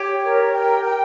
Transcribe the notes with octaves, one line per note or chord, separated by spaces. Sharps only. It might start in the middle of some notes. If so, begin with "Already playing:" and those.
Already playing: G4 C#5
A#4
G5
G5